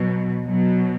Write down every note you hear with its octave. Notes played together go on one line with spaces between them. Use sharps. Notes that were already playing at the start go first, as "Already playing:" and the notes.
Already playing: B2 F#3
B2 F#3